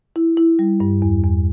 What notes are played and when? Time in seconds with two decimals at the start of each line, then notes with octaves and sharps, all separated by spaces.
0.16 E4
0.37 E4
0.59 G3
0.80 G2
1.02 E2
1.24 E2